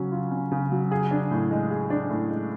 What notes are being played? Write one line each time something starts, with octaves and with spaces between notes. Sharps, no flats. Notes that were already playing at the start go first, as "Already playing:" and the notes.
Already playing: C#3 F#3 C#4
F4
C#4
C#3
F#3
G#4
D4
A2
G#3
G#4
D4
A2
G#3